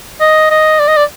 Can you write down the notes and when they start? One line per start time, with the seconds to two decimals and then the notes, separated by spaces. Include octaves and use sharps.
0.21 D#5
0.50 D#5
0.80 D5
0.88 D#5
0.97 D5